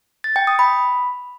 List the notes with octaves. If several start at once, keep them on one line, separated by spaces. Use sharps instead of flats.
A6
G5
D#6
B5